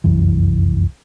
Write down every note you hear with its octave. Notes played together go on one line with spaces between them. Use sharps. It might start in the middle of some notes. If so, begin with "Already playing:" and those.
F1 C2 F#2 E3